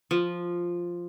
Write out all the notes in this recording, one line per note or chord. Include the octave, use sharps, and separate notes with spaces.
F3